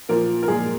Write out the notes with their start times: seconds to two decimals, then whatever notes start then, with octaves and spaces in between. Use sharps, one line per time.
0.09 A#2 F3 A#3 A#4
0.43 A#4
0.48 A#2 F3 G#3 G#4